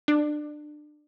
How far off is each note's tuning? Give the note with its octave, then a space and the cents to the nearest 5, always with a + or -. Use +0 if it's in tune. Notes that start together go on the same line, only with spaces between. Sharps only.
D4 +25